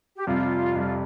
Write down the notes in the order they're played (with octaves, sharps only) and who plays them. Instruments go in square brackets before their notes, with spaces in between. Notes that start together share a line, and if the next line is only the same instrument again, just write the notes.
[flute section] G4
[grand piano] F2 C3 G3 [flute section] F4
[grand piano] F2 C3 G3